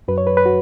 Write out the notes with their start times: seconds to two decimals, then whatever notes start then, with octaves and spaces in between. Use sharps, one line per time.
0.08 F#2 F#3 B4
0.18 C#5
0.27 B4
0.37 B4
0.46 F#4